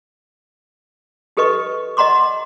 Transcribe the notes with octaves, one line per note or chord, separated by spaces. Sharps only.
D#4 G4 A4 B4 D#5 C#6
D#5 F#5 A#5 C6 D6